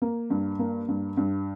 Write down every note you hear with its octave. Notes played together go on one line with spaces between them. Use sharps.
A#3
G2
A#3
G2
G2